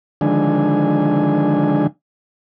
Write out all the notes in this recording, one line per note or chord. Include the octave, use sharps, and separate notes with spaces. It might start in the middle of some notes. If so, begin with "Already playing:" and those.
D3 D#3 F3 G#3 D4 G#5